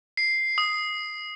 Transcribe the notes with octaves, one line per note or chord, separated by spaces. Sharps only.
C7
D#6